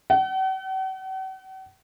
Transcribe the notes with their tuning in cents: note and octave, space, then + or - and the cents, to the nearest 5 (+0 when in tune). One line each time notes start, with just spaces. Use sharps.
F#5 +45